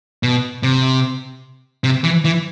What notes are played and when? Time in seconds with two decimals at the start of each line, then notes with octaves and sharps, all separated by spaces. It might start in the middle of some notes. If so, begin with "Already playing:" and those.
0.23 B2
0.63 C3
1.84 C3
2.04 E3
2.25 E3